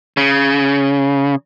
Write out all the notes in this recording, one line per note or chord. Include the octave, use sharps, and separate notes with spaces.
C#3